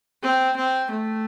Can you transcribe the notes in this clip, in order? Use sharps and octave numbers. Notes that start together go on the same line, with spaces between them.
C4
C4
A3